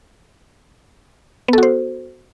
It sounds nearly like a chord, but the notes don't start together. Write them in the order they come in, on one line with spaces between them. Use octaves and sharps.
B3 A4 F#4 C5